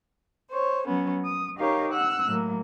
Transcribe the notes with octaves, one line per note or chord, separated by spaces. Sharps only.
C5 C#5
F#3 B3 C#4
D#6
D#4 G4 A#4 C#5 F5
F#5 E6 F#6
A2 F#3 A#3